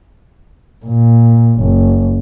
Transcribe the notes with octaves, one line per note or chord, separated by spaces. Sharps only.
A#2
F#1